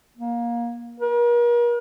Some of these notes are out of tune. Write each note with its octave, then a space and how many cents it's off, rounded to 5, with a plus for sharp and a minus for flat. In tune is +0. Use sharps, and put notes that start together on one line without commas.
A#3 +20
A#4 +40